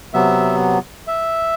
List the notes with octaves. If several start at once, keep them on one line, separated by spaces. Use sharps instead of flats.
C3 F#3 B3 E5
E5